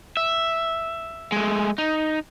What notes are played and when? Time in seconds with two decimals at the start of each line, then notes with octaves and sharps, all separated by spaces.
0.17 E5
1.32 G#3 A3
1.78 D#4